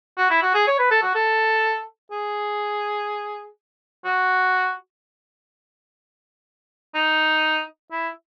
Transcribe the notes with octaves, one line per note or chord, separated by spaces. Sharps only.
F#4
E4
F#4
G#4
C#5
B4
A4
F#4
A4
G#4
F#4
D#4
E4